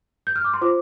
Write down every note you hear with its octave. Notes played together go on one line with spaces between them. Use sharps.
G6
F6
D6
C6
F4 C5 D6